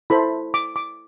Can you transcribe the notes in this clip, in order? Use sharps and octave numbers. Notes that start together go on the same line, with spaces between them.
E4 A4 C5 B5
D6
D6